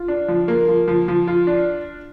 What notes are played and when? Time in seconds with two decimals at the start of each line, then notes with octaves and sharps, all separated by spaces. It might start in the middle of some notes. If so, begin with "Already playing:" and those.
Already playing: F4
0.08 D4
0.28 F3
0.48 A#3
0.68 F3
0.88 F3
1.08 F3
1.27 F4
1.47 D4